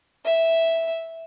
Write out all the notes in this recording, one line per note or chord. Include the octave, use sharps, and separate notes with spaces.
E5